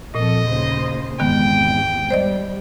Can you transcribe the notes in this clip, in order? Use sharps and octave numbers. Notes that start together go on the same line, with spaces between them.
A#2 F3 C4 A4 D#5
D#2 C#3 C5
E2 G#2 C3 D#3 G#3 B3 G5
G3 C5 D5 D#5